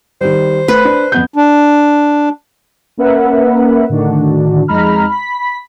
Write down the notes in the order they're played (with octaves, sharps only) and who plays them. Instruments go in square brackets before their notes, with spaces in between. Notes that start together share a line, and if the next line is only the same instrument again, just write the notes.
[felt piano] D#3 G3 [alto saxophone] C5
[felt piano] A3 [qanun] B4
[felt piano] D4
F2 B3 G6
[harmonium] D4
[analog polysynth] A#3 C#4 A#4 B4 E5 F#5
A2 D3 D#3 D4 F#4
F2 G#3 D#4 A#5 B5 F6
B5 B6